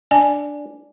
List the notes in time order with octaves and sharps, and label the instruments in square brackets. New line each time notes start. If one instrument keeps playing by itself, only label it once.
[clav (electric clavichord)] D4 [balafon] G#5